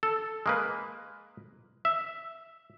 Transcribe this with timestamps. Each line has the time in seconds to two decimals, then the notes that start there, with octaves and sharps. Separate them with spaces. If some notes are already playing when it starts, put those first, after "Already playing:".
0.03 A4
0.46 G#3 A#3 B4
1.85 E5